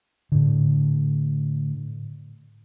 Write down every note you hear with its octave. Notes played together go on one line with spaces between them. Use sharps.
A2 D3